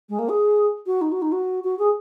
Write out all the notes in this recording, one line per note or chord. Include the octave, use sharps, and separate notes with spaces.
G#3
A#3
G#4
F#4
D#4
F#4
D#4
F#4
F#4
G#4